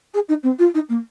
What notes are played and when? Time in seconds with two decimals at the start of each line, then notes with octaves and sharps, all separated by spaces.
0.14 G#4
0.28 D#4
0.43 C4
0.58 F4
0.74 D#4
0.89 A#3